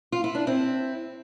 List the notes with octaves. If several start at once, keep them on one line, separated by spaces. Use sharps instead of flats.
F4
E4
D4
C4 E4